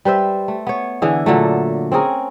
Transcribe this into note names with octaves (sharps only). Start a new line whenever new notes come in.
G3 B4 C5 E5
A3
B3 C#5
D3 E3 G#4
A#2 D3 F#3 A3
C4 C#4 G#4 A#4